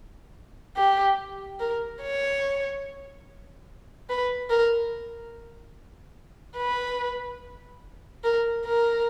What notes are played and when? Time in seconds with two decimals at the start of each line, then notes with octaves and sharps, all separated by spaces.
0.76 G4
1.60 A#4
2.02 C#5
4.09 B4
4.50 A#4
6.58 B4
8.24 A#4
8.65 A#4